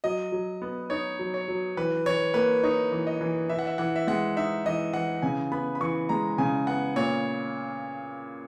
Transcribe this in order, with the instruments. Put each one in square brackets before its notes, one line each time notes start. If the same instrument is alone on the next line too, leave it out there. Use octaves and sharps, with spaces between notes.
[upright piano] F#3 [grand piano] D#5
[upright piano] F#3
B3
[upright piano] D#4 [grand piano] C#5
[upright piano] F#3
[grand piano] C#5
[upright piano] F#3
[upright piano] E3 [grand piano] B4
[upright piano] E3 [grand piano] C#5
[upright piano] A#3 [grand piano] B4
[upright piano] D#4 [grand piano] C#5
[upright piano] E3
[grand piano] D#5
[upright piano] E3
[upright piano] E3 [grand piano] E5
[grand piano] F#5
E5
[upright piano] E3 [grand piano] F#5
[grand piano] E5
[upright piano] G#3 [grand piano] F#5
[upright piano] D#4 [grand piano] E5
[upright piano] E3 [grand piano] D#5
[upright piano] E3 [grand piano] F#5
[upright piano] C#3 [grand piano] G#5
[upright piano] B3 [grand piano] B5
[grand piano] B5
[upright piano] E3 [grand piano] C#6
[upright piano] G#3 [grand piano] A#5
[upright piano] C#3 [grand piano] G#5
[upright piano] B3 [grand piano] F#5
[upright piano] A#2 [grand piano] C#5